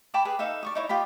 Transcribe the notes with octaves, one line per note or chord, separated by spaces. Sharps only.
G5 A5 B5 D6
G#4 B4
D#4 A4 E5 F5
D5 C#6 D#6
D#4 E4 C#5
F4 G4 D#5 B5